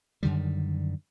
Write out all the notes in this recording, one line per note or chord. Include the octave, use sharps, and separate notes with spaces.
F#2 D3 D#3 G3